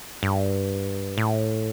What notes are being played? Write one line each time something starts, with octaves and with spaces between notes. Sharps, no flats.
G2
A2